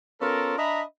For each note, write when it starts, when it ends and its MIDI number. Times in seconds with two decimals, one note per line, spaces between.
0.22 0.56 59
0.22 0.56 61
0.22 0.56 65
0.22 0.56 69
0.22 0.56 70
0.58 0.82 62
0.58 0.82 75
0.58 0.82 76
0.58 0.82 82
0.58 0.82 83